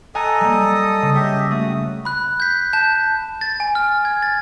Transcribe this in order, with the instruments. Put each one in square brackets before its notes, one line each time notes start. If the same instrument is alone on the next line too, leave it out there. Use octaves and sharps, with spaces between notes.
[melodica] A4 D#5 D#6 [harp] G#5 A#5 F#6
[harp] G3 A#3
C#3
[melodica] G4 D#5 E5
[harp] A3 [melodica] F#4 D#6
[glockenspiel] B5 F#6
G6 B6
A5 G6
A6
G#5
F6
G#6
A6